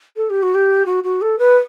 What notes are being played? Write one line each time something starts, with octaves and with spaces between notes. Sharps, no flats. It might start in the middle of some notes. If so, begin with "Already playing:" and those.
A4
G4
F#4
G4
F#4
F#4
A4
B4